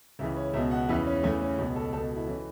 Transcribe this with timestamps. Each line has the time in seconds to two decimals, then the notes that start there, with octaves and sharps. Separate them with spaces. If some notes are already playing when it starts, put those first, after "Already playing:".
0.19 C#2 C#3 E3 E5
0.36 C#5
0.54 C#2 B2 E5
0.71 F#5
0.89 E2 C#3 E3 E5
1.07 C#4
1.23 E2 C#3 E3 A3
1.41 C#4
1.58 C#2 F#4
1.61 B2
1.76 A4
1.93 C#2 A4
1.96 B2
2.04 F#4
2.16 E4
2.28 E3 C#4